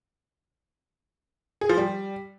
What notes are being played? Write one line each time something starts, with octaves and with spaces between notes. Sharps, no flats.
G#4
F3
G3